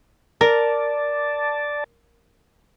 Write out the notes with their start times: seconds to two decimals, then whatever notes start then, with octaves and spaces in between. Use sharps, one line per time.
0.41 A#4 D5 A5